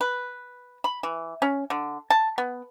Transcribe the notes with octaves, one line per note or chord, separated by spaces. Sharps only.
B4
B5
E3
C#4
D3
A5
B3